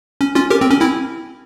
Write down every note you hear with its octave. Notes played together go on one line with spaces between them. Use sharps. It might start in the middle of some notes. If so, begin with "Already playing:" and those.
C#4
C#4 F4
G4 A#4
C4
C#4
C4 E4